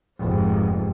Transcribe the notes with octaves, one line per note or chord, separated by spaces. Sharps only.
F1 G#2